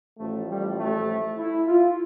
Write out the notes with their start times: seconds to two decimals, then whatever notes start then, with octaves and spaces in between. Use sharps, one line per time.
0.18 A1 A2 F3 A3
0.48 G3
0.77 A3
1.37 E4
1.67 F4